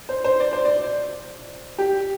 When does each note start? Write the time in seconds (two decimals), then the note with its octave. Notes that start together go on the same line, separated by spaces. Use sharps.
0.09 C5
0.24 C5
0.40 D5
0.53 C5
0.65 D5
1.78 G4